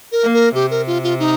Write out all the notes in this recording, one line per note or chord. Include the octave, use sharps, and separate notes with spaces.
A#4
A#3
A#4
C3 G4
A#4
F4
F4
D#4